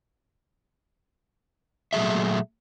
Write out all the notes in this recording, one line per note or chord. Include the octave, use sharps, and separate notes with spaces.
A#2 F#3 A3 G#4 E5